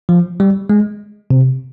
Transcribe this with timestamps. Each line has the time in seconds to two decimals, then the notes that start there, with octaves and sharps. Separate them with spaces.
0.09 F3
0.40 G3
0.70 G#3
1.30 C3